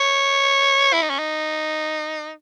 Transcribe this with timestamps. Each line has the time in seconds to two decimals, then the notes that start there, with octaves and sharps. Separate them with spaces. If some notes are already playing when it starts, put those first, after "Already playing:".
Already playing: C#5
0.93 E4
1.02 D#4
1.10 C#4
1.19 D#4